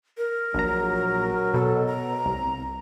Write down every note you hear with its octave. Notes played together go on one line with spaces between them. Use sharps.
A#4
A#1 F#3 A#5
B2 A4
A#5
C2